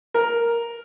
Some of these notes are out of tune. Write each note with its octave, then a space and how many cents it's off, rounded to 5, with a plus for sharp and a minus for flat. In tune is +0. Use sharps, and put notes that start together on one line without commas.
A#4 +5